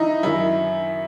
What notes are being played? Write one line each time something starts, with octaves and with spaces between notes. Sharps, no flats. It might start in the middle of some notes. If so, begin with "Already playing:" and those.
Already playing: E3 D#4 E4
F#2 D#3 E4